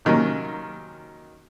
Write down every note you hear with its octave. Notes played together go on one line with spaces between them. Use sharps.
C3 D#3 F#3 A#3 C#4